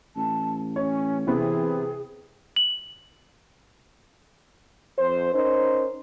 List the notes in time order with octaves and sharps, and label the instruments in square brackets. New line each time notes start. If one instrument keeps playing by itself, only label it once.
[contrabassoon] A1 [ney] A5
[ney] C#4 [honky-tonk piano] C#5
[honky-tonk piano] C3 B3 [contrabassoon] E3 [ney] G#4
[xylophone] F#7
[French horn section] F2 C5
C#4 D#4 A#4 C5